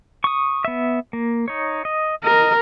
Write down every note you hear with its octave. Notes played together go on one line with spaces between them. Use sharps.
C#6 D#6
B3 E5
A#3
D#4 C#5
D#5
A#4 D#5